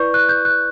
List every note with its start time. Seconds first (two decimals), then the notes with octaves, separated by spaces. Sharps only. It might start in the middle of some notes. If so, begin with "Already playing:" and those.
Already playing: E4 B4 D5 C#6 G6
0.14 F#6
0.29 G6
0.45 F#6